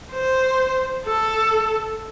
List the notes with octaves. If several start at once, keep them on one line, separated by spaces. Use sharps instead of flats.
C5
A4